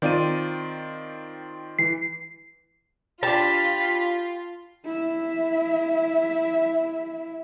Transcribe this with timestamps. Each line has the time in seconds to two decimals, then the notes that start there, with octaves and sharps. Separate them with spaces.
0.02 D#3 C4 F4 D5 D#7
1.79 E3 C7
3.23 D4 F4 G4 A5 B5
4.85 E4 E5